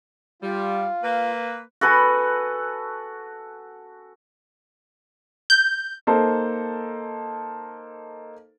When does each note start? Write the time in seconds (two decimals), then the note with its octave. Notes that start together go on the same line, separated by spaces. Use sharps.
0.42 G3 F4
1.03 A#3 B4
1.81 F#4 A4 B4 G#5
5.50 G6
6.07 A#3 D#4 A4 C5